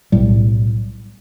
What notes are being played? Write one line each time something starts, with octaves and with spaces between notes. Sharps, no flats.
B1 A2 G3